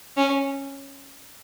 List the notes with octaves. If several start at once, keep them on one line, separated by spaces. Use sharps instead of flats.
C#4